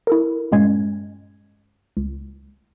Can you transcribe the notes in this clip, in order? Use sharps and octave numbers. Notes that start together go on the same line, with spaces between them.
E4 A4 A#4
G2 A#2 G#3 C#4 G#6
C#2